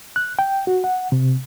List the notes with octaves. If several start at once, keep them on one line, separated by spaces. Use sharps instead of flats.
F#6
G5
F#4
F#5
C3